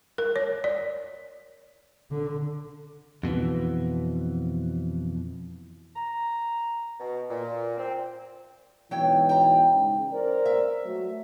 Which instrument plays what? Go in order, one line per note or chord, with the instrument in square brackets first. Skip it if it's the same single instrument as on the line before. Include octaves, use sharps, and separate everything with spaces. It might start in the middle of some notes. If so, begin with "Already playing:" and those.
[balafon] A#4
C#5
D5
[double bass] D3
[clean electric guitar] F2 B2 D3 E3
[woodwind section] A#5
B2
A#2
C4
[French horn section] G#2 B2 E3 [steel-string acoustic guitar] F#3 C#5 G5
[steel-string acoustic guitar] G5 A#5
[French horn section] G#2 C#3
A#4 C5 D5
[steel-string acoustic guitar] E5
[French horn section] F#3 A3